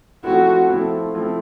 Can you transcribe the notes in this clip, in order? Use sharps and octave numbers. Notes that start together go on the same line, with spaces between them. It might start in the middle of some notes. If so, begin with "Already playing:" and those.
F3 A3 C4 E4 F#4
F3 A3 C4 E4
F3 A3 C4 E4